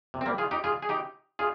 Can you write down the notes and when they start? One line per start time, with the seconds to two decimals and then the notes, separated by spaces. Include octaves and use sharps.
0.14 C3
0.21 C4
0.26 G3 A#3
0.38 F4 G#4
0.51 D#4 G4
0.64 F4 G#4
0.82 G#4
0.89 D#4 G4
1.39 F4 G#4